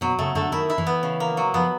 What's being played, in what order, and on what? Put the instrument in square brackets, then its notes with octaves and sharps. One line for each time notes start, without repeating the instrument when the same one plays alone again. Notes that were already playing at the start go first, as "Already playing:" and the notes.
[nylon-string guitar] B2 [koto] F#3
[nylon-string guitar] C#3 [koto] A3
[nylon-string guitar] D3 [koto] A3
[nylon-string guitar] D#3 [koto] E4
[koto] E4
[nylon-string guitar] E3
[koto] B3
C#3
A#3
F#3
[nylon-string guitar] F3 [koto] B3